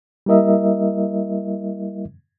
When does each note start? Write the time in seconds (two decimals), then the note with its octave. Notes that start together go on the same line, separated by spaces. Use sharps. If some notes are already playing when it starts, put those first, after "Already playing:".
0.26 G3 A#3 E4 A#4 D#5 E5